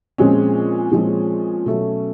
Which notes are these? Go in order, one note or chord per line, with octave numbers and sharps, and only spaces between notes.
A#2 F3 G#3 C4 C#4
A#2 F3 G#3 C4
B2 F#3 A3